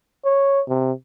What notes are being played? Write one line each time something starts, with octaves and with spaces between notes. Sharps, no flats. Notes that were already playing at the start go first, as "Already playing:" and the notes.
C#5
C3